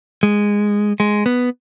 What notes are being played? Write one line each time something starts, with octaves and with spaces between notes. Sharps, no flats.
G#3
G#3
B3